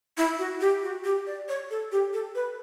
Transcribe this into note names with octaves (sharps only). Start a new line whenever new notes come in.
E4
F#4
G4
F#4
G4
D5
C#5
A4
G4
A4
B4